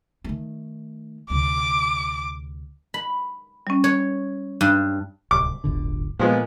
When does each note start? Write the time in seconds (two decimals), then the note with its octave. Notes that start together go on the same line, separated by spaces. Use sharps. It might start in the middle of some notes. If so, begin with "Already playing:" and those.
0.24 D#3 A3
1.30 D2 C3 D6
2.94 B5
3.67 G3 C#4
3.84 C#5
4.61 G2
5.31 D1 C2 D6
5.64 D1 G1 D3
6.20 A#2 F3 G#3 B3